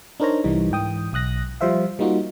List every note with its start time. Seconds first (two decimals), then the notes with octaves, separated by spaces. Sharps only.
0.20 D4 D#4 A#4 C5 C#5 A#5
0.44 C2 E3 G3 D#4
0.71 G#2 E3 G5 D#6
1.13 B1 D#6 F#6 A#6
1.61 F3 G3 C5 E5 F5
1.99 G3 A#3 D#4 F4 F#4